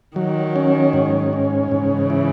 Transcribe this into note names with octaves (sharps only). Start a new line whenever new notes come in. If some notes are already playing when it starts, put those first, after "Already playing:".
D#3 F#3
C#4
G#2
C#4
G#2 C#3 E3
E4